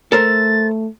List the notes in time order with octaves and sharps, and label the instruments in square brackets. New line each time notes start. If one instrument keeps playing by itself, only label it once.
[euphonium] A3 [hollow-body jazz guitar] A4 A#4 C5 [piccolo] A6